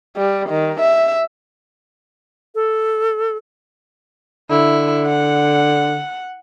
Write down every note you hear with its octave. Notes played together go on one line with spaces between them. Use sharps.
G3
D#3
E5
A4
D3 E4
F#5